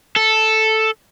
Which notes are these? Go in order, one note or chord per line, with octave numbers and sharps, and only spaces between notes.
A4